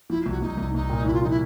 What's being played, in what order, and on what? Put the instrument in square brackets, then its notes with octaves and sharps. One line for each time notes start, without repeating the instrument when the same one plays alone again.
[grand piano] F3 [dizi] E4
[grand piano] C2
[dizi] F#4
[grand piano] C2 [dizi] D#4
[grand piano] C2
[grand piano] C2 [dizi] D#4
[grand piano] A#2
[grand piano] C2 [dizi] E4
[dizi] F4
[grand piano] F3 [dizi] D#4
[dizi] E4